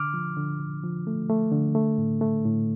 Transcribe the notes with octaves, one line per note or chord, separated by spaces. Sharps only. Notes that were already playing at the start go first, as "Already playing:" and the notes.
Already playing: D3 D6 F6
F3
D3
D3
F3
A3
A3
D3
A3
A2
A3
A2